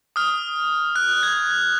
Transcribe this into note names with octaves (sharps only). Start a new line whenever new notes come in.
D#6 F6
F#6
G#6